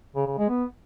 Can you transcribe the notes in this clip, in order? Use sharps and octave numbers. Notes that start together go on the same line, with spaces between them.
C#3
C#3
G#3
B3